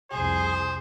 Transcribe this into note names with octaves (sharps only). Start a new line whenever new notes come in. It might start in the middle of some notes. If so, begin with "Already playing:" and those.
C2 F2 G#4 C5